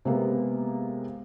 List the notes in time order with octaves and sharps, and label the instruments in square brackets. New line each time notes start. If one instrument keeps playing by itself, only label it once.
[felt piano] C3 G#3 A#3 B3